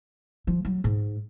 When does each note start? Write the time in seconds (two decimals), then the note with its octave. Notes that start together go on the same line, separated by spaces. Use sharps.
0.47 F3
0.65 F#3
0.84 G#2